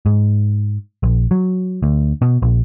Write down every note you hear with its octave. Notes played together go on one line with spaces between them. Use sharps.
G#2
A#1
F#3
D2
B2
A#1